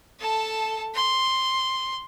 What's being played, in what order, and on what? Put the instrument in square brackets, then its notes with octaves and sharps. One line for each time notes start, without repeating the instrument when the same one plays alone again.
[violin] A4 A5
C6